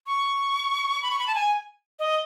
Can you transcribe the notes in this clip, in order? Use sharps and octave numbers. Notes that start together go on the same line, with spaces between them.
C#6
B5
C#6
B5
A5
G#5
D#5